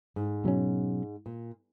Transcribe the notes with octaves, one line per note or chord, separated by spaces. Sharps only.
G#2
B2 F#3 C#4
A#2